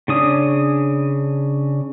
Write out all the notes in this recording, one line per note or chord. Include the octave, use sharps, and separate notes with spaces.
C#3 D4 D#6